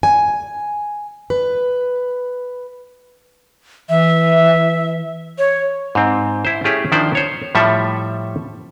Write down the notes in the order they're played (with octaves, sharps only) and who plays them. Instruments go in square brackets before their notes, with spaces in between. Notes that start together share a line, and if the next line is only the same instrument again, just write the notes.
[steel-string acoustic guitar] G#5
B4
[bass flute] E3 [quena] E5
[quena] C#5
[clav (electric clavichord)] G#2 C4
E4 C5
A3 C#4 E4 G4 G#4
D#3 F3 D4 E4 C5 D5
C5 C#5
A2 F3 G3 A4 E5